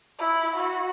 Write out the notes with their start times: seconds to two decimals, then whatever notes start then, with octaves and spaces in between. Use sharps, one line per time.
0.19 E4
0.56 F#4